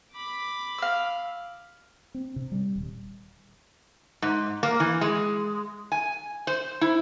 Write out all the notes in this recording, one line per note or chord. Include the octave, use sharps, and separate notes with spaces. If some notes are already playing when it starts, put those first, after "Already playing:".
B5 D6
F5 E6
C4
C3
G3
D#1
G#2
A#3
E3
G#3
G#5
C5
E4